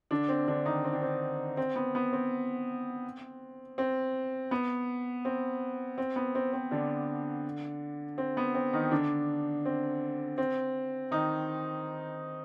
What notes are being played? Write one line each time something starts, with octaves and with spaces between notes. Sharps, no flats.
D3 D4
C4
D3 D4
D#3 D#4
C4
D4
C4
C4
B3
B3
C4
C4
B3
C4
C4
B3
C4
C4
D3 D4
C4
B3
C4
D#3 D#4
D3 D4
C4
C4
D#3 D#4